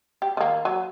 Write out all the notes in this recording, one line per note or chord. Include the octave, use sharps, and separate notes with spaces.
G4
D#3 A#3
F#3